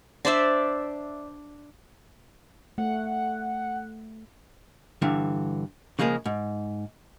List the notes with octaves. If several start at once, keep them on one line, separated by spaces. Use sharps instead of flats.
D4 C5 D5 E5
A3 F#5
G2 D3 E3
C#3 F3 G#3 A#3 G#4
G#2